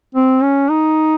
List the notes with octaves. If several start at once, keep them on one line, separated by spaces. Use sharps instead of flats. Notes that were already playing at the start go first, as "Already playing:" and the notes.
C4
C#4
D#4